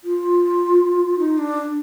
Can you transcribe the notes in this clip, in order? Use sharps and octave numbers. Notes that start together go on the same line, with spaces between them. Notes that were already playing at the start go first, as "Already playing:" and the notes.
F4
D#4
D4